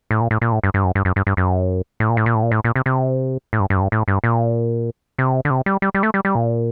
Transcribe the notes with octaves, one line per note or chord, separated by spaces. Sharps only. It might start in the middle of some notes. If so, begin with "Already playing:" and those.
A2
A#2
A2
A#2
A2
G2
G2
F#2
G2
F#2
G2
G2
F#2
A2
A#2
A2
A#2
A2
A#2
A2
A#2
C3
C3
A2
G2
G2
F#2
G2
A2
G2
A#2
C3
D3
C3
G3
G3
G3
A3
G3
G3
A#2